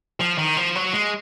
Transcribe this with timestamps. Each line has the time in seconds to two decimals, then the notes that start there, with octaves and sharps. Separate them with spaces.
0.20 F3
0.38 D#3
0.57 F3
0.75 F#3
0.94 G#3